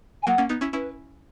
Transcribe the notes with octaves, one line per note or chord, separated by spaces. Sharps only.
G#5
F#3 A#3 F#5
A#3 C#4
B3 D#4
C#4 E4
C#4 E4 B4